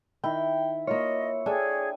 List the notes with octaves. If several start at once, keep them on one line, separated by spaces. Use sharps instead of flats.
D#3 E4 G5
A#3 F4 C#5 D#5
D4 G#4 A4 G5 G#5